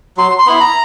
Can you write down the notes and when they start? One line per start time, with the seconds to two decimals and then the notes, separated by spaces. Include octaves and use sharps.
0.17 F#3 C6
0.39 C6
0.46 B3 E4 B5
0.60 A#5